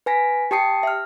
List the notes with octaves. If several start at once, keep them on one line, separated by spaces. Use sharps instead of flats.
B4 G#5 A#6 B6
G4 G5 A5 D#6 C7 C#7
E5 F6